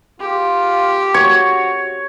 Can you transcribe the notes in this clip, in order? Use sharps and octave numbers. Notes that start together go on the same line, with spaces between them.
F4 G4
F#4 C#5